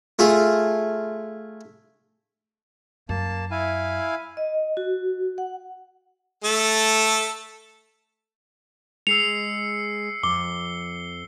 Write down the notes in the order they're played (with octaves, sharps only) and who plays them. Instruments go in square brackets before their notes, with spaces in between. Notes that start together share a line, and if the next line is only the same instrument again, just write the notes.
[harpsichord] A3 F4 G#4
[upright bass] F#2 [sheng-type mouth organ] A#3 A5
[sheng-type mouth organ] E4 F5 G#5
[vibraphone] D#5
F#4
F#5
[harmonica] A3 A4
[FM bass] G#3 [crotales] E6 C7 C#7 [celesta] F7
[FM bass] F2 [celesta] D6 [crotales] G7